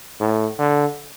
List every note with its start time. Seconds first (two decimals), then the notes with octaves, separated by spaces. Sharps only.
0.20 A2
0.58 D3